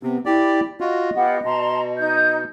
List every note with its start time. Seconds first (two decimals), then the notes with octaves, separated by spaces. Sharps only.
0.03 C3 B3
0.26 E4 G4 D5
0.81 F4 F#4 D#5
1.15 B3 F4 G4 F#5
1.44 B2 A5 A#5 C6
1.98 D#4 G6